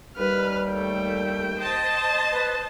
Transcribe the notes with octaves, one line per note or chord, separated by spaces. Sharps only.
D#2 G3 B4 F6
A3 G5
C5 D#5 A5
B4